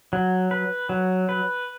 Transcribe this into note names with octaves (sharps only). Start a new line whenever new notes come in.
F#3
B4
F#3
B4